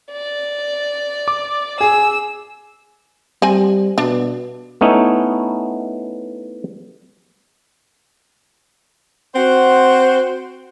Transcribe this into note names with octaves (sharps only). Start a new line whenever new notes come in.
D5
D6
G#4 G#5 E6
G3 C4 G#5
B2 D4
A3 B3 C#4 D#4 E4
C4 F#4 C5 F#5